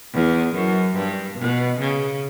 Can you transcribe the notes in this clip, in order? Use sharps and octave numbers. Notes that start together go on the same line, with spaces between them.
E2
F#2
G2
B2
C#3